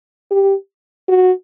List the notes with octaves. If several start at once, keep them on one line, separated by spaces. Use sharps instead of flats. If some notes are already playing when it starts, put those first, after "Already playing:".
G4
F#4